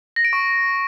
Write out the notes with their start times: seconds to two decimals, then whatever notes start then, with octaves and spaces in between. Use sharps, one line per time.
0.16 A#6
0.25 D7
0.33 C#6